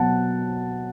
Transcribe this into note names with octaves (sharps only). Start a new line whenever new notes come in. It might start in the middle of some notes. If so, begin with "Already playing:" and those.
Already playing: B2 F#3 F#5 A5